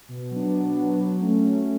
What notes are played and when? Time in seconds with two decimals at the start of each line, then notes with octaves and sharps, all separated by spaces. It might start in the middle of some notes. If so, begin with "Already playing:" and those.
0.09 B2
0.31 F#3 B3 D4
0.54 B2
0.76 F#3 B3 D4
0.99 F#3
1.21 A3 C#4
1.43 F#3